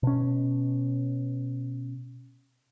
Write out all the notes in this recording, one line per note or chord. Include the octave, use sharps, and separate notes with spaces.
B2 C#4